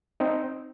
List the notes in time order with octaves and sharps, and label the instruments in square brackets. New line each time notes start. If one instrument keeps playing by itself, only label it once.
[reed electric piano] C4 D#4